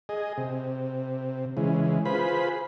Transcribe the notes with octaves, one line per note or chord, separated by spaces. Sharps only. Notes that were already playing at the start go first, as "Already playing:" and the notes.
G#4 D#5
C3
C#3 E3 G#3
F4 G#4 B4 C5 B5